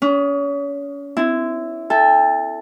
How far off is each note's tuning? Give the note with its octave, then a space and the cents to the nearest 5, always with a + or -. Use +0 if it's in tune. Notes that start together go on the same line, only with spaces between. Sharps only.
C#4 +35 C#5 -10 D#6 +0
C4 -30 E4 +0
A4 +0 E5 +0 G5 +35